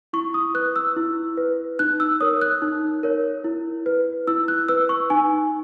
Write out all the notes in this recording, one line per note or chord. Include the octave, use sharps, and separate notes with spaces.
E4 C#6
D#6
B4 F#6
E6
E4
B4
D#4 F#6
E6
A#4 C#5 D#6
F#6
D#4
A#4 C#5
E4
B4
E4 E6
F#6
B4 E6
C#6
D#4 G#5